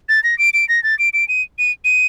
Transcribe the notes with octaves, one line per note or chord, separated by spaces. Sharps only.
A6
A#6
D7
D7
A#6
A6
D7
D7
D#7
D#7
D#7